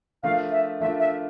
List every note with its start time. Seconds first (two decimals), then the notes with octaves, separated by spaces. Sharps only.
0.23 F3 A3 D4 F4 A#4 F5
0.52 E5
0.80 F3 A3 D4 F4 A#4 E5
0.99 E5